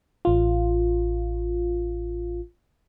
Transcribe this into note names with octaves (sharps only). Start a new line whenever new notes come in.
A1 F4